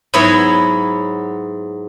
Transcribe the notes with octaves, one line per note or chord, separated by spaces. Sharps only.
G#2 F#3 B3 E4 C#5